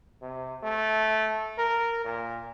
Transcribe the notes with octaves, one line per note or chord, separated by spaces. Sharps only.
C3
A3
A#4
A#2